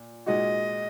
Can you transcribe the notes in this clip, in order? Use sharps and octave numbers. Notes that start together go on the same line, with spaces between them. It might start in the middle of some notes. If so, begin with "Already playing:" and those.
Already playing: A#2
A#2 G#3 D#4 F#4 D#5